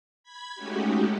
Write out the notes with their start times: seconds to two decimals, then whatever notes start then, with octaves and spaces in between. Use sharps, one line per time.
0.23 B5 G#6 B6
0.55 G#3 A3 C#4 D#4 F#4 G4